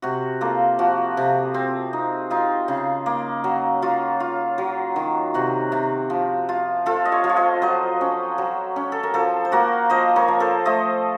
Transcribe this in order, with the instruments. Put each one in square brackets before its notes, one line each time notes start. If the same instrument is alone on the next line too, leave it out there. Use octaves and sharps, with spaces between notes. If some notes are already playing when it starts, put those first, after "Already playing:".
[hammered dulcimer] C3 F#4
A#3 F4 A4
F3 F#4
C3
C4
D#4
D#4 F4
C#3
A#3
F#3
F#3 F4
F4
F#3
D#3
C3 F#4
C3
F3
F4
F3 F4 A4
D#5
C#5 F5
F3
C#5
C5 D#5
F#3 C5 D#5
C#4
F#3
C#4
A4
A#4
F3 A4 C5
C5
A#3 F#4 A#4
F3 C5 D#5
A#4 C#5
F3
A4 C5
A3 C5 D#5